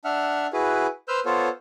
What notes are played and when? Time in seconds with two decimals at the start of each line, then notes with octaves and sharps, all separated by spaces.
0.05 D4 E5 F#5 F6
0.53 E4 F#4 G#4 B4
1.08 B4 C5 E6 F6 G6
1.25 B3 F4 A4 C5 C#5